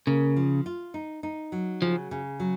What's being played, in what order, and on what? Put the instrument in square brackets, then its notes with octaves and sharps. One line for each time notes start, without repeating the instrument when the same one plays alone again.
[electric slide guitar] C#3 [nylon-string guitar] A#3
[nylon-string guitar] F3
F4
D#4
D#4
F#3
[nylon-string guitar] C#3 [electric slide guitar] F3
[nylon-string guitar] C#3
F#3